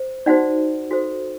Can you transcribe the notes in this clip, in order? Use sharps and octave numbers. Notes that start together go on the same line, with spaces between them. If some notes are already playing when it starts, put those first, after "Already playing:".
Already playing: C5
D#4 F#4 C5 D5 F#5
F#4 A4 C5